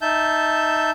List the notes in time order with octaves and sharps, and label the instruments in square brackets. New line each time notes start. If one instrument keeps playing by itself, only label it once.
[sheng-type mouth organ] D#4 E5 A5 G6